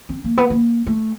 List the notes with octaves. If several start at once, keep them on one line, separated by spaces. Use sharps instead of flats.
C4
A#3
B3
A#3
A3